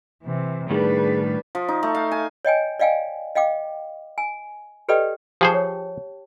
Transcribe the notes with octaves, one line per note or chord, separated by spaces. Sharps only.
C3 E3
A2 D#3 G3 D4 G#4 B4
F3
D#4
A3
F5
G#5
C#5 D#5 G5 G#5
D5 D#5 F5 G5 G#5
D#5 F5 G5 D6
G#5
G4 A4 B4 D5 D#5 G5
F3 G4 G#4 C5 G5 A5
C#5